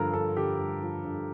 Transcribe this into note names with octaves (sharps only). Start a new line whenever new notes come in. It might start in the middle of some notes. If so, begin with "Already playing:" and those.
Already playing: G2 D3 F3 A4 A#4
G2 A4
D3 G4
G2
F3
G2